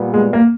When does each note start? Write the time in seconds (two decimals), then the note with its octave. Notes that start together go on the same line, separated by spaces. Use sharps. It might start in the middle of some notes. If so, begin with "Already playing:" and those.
Already playing: A#2 G3 B3
0.14 G#3
0.33 A#3